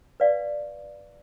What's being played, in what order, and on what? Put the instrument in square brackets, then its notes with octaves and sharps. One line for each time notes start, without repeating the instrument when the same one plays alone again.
[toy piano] B4 D5 F5